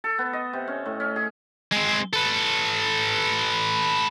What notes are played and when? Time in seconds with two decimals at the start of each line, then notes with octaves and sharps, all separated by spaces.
0.04 A4
0.19 B3
0.33 D#5
0.53 C3
0.68 C#4
0.86 A2
1.00 C#4
1.16 G#4
1.72 G#3 C4
2.13 A4 B4